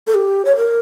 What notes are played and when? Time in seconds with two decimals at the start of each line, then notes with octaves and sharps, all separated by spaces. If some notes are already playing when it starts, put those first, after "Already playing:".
0.07 A4
0.15 G4
0.45 C#5
0.57 A#4